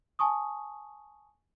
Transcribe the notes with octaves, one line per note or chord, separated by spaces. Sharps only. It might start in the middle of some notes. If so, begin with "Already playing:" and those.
G#5 A5 C#6 D#6